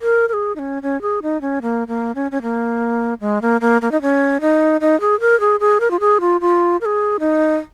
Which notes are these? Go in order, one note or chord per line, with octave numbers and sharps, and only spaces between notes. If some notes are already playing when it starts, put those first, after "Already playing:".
A#4
A#4
G#4
D#4
C#4
C#4
G#4
D#4
C#4
A#3
A#3
C#4
C#4
A#3
G#3
A#3
A#3
A#3
D#4
C#4
D#4
D#4
G#4
A#4
G#4
G#4
A#4
F4
G#4
F4
F4
A#4
G#4
D#4